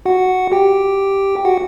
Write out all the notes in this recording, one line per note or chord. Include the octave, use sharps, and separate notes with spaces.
F#4 F#5
G4 G5
F#4 F#5